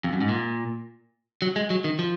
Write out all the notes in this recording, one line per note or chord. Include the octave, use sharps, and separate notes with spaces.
F2
F#2
G#2
A#2
F#3
G#3
F#3
D#3
F3